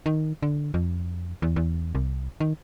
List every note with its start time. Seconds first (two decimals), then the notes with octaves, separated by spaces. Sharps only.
0.06 D#3
0.43 D3
0.74 F2
1.42 E2
1.56 E2
1.95 C2
2.40 D#3